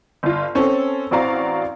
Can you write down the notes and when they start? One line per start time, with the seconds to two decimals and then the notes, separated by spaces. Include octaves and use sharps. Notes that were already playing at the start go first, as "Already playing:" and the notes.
0.23 G1 F4
0.55 C4 C#4 A4
1.11 A1 C4 F#4 D5 F5 A#5